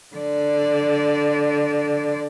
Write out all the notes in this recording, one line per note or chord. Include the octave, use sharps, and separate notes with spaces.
D3 D5